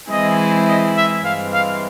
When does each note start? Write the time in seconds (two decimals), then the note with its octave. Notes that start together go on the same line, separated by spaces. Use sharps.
0.10 E3 G#3 C4 E4 G#4 D#5
0.68 D#5
0.97 E5
1.24 G2 E3 G#3 C4 F5
1.53 F5